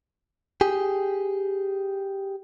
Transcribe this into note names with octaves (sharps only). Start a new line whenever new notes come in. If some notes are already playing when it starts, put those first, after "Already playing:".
G4 G#4